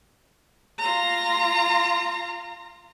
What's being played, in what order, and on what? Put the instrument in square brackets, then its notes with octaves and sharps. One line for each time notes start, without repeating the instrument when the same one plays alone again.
[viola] F4 A#5